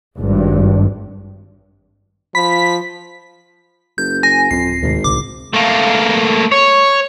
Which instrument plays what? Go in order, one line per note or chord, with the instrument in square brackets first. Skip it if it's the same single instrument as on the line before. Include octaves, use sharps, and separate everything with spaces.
[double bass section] G#1 G2
[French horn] F3 [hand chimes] B5 [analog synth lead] B6
[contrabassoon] F#1 [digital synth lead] G6
[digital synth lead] G#5 [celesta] A#6
[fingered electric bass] D1 C4 [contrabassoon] F2 [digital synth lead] C7
[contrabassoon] G#1 [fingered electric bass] D#2 A2 C3
[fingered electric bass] D1 C2 D3 [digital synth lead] D6
[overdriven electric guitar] A3 A#3
C#5